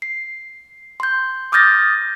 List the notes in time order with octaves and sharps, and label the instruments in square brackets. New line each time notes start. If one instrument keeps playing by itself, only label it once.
[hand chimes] C7
C6 G6
D6 D#6 F6 G6 A6 A#6